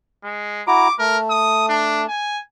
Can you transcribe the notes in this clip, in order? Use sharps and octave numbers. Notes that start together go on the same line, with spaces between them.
G#3
E4 F#4 A#5 D6
A3 A#4
D#6
D4
G#5